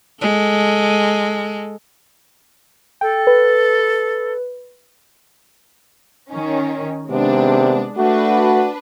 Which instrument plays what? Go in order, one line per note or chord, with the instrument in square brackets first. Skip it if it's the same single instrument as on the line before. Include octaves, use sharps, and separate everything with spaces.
[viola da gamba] G#3 A4
[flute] A4 [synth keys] G5
[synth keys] B4
[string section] D#3 C#4
[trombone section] C3 D#3 B3 [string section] G#3 D4
[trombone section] A3 F#4 [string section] D4 B4